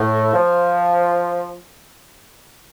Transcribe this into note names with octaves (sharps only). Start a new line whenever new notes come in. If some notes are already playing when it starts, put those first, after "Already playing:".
Already playing: A2
F3